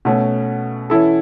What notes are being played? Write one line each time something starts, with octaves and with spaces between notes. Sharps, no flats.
B2 A3 C#4
E3 C#4 E4 A4